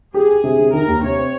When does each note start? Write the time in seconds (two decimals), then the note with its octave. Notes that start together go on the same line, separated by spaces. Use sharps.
0.14 G4 G#4
0.29 G4
0.44 C3
0.59 C3
0.73 D#3 A#4
0.88 D#2
1.03 C3 C#5
1.18 C4